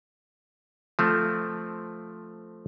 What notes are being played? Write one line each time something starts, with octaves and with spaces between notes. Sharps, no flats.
F3 A3 C4